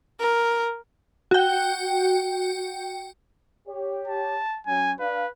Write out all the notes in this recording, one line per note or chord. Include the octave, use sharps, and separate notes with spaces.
A#4
F#4 G5
G4 C#5
A5
F#3 C#4 G#5
D4 B4 F5